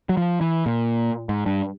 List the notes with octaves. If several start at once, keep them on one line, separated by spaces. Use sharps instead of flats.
F#3
F3
E3
A#2
G#2
G2